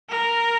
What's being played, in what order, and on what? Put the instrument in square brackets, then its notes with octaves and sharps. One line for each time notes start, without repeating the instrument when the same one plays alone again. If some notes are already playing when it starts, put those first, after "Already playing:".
[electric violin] A#4